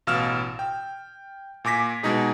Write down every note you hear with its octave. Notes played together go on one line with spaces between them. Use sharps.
A1 B2 F5 E6 F6 E7
G5
A#2 G#5 D6 A#6 B6
B2 G#3 D#4 G#4